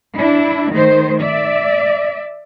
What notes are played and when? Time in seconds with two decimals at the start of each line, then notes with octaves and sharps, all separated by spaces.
0.16 D4 E4
0.72 D#3 A3 C5
1.22 D5 E5